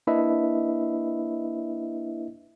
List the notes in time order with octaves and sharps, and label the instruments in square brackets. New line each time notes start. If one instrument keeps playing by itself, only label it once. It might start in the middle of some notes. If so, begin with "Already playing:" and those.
[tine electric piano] A#3 D4 E4 B4 D#5 E5